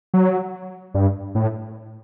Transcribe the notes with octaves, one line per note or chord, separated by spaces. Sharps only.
F#3
G2
A2